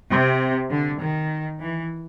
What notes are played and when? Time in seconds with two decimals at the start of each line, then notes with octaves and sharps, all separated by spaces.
0.09 C3
0.70 D3
0.99 D#3
1.59 E3